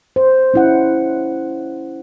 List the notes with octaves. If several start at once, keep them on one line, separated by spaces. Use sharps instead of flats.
C5
C#4 E4 F#5